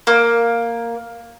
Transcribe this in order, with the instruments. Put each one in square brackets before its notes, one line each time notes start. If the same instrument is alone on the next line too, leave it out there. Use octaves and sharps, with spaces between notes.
[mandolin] A#3